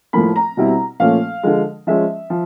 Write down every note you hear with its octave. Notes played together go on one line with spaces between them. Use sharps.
A2 F3 A#3 B5
A#5
B2 G3 C4 E4
A#2 F3 A3 C#4 F5
D3 F3 G#3
F3 G#3 C#4 E5
F3